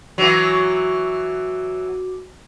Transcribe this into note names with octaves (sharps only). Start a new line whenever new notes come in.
E3 F#3 F#4 D6